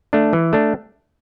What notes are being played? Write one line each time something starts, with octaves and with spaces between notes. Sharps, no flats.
A3 D4
E3
A3 D4